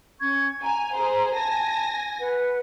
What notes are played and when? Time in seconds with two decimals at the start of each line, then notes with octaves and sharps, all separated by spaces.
0.21 C#4 C#6 G#6
0.63 G#5 A#5
0.95 G#4 C5
1.32 G#5 A5 A#6
2.20 B4 F#5